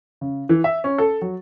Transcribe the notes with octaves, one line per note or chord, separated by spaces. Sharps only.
C#3
E3
E5
C#4
A4
F#3